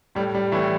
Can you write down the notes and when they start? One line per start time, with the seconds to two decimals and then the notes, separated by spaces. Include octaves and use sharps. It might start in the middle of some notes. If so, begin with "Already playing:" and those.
0.15 A2 G3
0.35 G3
0.52 A2 E3 A3